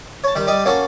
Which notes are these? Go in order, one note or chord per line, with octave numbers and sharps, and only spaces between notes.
C#5 A5
D#3 G3
G3 D5 D#5
A#3 C#4 F#4 A4